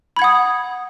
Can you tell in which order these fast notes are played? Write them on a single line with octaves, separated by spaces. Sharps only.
B5 G#6 F#5 D#6